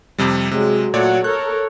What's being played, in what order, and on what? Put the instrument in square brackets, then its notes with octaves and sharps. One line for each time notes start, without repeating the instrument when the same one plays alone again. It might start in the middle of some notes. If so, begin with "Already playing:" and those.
[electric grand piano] F2 C3 G3
[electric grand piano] C3 [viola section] F#3 G#3
[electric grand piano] A#2 C#5 D5 [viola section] F#3 A3 F#5
[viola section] A4 A#4 C#5 [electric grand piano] F#6